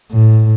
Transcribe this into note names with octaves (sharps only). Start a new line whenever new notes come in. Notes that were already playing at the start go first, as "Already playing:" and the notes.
A2